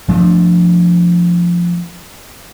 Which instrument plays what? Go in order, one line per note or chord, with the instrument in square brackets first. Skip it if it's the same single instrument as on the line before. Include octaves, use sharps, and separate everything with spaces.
[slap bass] F3 A3 D4